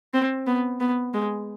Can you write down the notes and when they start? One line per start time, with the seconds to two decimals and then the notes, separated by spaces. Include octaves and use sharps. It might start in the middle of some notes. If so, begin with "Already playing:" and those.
0.14 C4
0.47 B3
0.80 B3
1.14 G#3